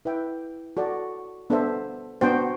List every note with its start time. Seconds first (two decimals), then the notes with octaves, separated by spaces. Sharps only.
0.05 E4 B4 E5 G5
0.77 F#4 A4 D5
1.50 B3 D4 A4 C5 E5
2.21 B3 D4 F#4 C5 G5